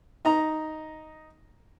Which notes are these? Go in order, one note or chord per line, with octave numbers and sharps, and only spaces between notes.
D#4 A#5